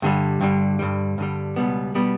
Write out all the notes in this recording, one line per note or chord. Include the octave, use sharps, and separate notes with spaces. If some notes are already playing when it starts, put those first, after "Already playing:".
G2 D3 G3
G2 D3 G3
G2 D3 G3
G2 D3 G3
C#2 B2 G3 B3
B2 G3 B3